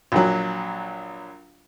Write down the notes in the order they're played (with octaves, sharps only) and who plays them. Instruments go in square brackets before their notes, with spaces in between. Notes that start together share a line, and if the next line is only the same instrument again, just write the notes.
[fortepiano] A#1 F#3